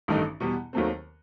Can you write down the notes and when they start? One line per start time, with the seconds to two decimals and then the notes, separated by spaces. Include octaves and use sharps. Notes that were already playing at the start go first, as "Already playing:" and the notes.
0.08 A1 G2 D#3 A3 D#4
0.40 E2 B2 G3
0.73 D#2 D#3 F#3 A3 C4